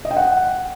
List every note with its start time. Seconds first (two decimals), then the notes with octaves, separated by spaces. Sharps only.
0.05 D#5
0.11 G5
0.17 F#5